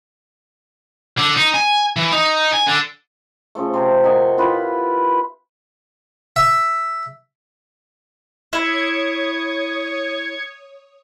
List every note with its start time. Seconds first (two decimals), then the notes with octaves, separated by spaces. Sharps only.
1.18 D3
1.36 D#4
1.55 G#5
1.96 E3
2.12 D#4
2.53 G#5
2.67 D3
3.55 C#3 F3 A3
3.73 C3 A4 C5
4.03 F#4 A#4 D#5 G#5
4.38 E4 F4 G4 B4
6.36 E5
8.53 E4 C#5 D#6 G#6 C#7